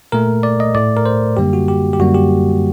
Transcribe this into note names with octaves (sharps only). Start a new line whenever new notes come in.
A#2 A3 A#4
D5
D#5
A2 A3 D5
A#4
C5
F#2 D3 G3 A#3 G4
F#4
G4
G4
F#2 D3 G3 A#3 F#4
G4